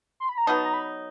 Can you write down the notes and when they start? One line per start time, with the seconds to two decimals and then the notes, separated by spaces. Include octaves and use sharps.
0.20 C6
0.29 B5
0.38 A#5
0.47 F#3 B3 D#4 A5
0.58 A5
0.66 A#5
0.74 B5